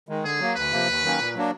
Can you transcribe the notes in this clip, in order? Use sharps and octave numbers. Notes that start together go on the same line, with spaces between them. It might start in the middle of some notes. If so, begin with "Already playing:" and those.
D#3 G#3
D3 G#4
F#3 A#3
D2 B4
C3 F3 A#3
D#2
D#3 F#3 A#3 C#4
A#2
F#3 A#3 D4